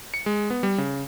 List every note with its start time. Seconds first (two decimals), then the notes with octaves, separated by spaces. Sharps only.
0.14 C#7
0.26 G#3
0.50 B3
0.63 G3
0.78 C#3